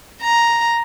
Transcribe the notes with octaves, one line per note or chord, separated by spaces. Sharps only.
A#5